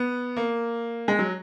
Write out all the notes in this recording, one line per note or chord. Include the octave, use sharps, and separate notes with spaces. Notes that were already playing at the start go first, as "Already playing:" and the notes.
Already playing: B3
A#3
G#3
F#3